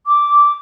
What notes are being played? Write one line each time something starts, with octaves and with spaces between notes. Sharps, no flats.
D6